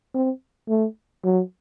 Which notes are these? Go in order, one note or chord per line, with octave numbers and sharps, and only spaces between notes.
C4
A3
F#3